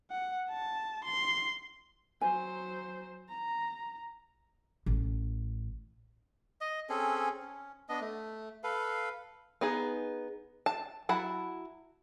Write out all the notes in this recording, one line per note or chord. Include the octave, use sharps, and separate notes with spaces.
F#5
A5
C6
F#3 C5 G#5
A#5
A1
D#5
C4 C#4 G#4 A4
C#4
B3 D4 D#5
A3
A4 B4 F5
B3 D#4 G#4
A5
F#3 E4 F#5 A5 B5